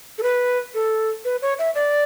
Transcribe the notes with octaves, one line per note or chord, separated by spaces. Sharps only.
A4
B4
A4
B4
C#5
E5
D5